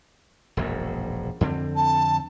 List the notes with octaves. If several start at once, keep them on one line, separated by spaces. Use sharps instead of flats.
E1 A#1 F#2
F2 D3 C4
A5